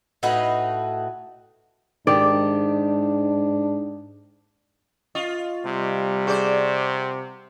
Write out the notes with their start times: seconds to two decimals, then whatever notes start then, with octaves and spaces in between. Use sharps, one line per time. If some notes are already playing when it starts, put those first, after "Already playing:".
0.23 A2 D#4 F#4 B4
2.07 G#2 D#3 D4 G4 D5
5.15 F4 D#5 C#6
5.65 C3 G3
6.27 G#4 C5 D5 F#5 C#6